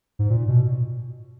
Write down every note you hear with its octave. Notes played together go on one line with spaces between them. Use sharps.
G#2
A#2
B2